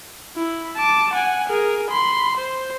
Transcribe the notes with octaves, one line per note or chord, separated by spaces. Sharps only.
E4
A5 D6
F#5 G#5
G#4 A#4
B5 C6
C5